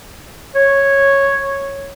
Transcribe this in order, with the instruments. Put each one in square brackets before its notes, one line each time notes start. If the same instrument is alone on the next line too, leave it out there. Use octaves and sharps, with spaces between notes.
[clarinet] C#5